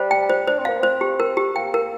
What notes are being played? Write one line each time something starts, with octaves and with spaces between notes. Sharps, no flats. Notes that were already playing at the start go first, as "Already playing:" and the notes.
Already playing: G3 C5
G5
C5
D4 C5
C4
A#3 F5
C4 C5
G4
A#4
G4
A#3 G5
A#4